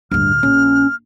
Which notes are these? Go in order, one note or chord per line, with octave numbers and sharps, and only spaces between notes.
D1 D2 G2 F6
A#1 C#4